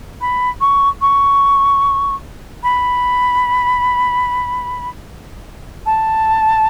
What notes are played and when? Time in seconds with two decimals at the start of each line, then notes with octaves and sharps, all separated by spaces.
0.21 B5
0.60 C#6
1.01 C#6
2.63 B5
5.86 A5